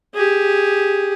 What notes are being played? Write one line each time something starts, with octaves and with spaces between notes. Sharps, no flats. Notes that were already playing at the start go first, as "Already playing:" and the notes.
G4 G#4